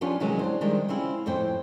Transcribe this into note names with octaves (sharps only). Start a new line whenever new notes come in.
F3 B3 C#4 D4 F4 G4
C3 D#3 E3 F#3 G#3 C#4
D4 C5
D#3 F3 G3 G#3 D4
C#3 C4 C#4 E4 F4
F2 A2 C5 G5